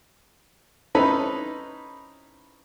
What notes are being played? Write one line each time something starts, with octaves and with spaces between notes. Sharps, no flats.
C4 C#4 D#4 E4 A4 B4